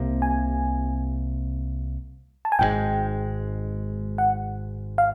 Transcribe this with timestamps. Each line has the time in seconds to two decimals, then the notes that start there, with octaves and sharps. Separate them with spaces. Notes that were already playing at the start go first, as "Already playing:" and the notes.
Already playing: C2 C3 A#3
0.22 G#5
2.45 A5
2.52 G#5
2.59 G#1 G#2 D#3 G#3 G5
4.18 F#5
4.98 F5